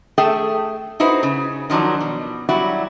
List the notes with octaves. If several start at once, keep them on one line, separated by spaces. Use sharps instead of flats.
A3 G#4 A4 E5 G5
D#4 E4 F#4 B4 C5
C#3
D#3 F3 F#3 D4 D#4
B2
F#3 G3 E4 F#4